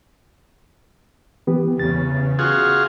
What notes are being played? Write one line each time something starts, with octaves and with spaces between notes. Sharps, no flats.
E3 B3 G4
E2 C#3 A6
F4 F#4 G#4